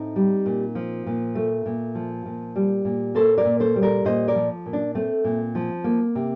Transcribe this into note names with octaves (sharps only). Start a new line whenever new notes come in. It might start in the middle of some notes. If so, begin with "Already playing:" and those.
Already playing: A2 C4 D#4
G3
A#2
F3
A#2
A3
A#2
F3
A#2
G3
A#2
A#3 A4 C5
A#4 D5
A#2
A4 C5
G3
A#4 D5
A#2 C5 D#5
A#4 D5
F3
A#2
D4
A3 C4
A#2
F3
A#3
C3